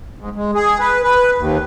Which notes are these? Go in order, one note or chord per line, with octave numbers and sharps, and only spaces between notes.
G#2
G#3
G#4
B4
B4
D#2